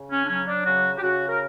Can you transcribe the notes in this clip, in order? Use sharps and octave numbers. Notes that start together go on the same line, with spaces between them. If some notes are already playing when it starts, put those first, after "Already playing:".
Already playing: C#3
C#4
D4
F#3 C#4
D4
C#3 F#4
G4
C#3 F#4
A#4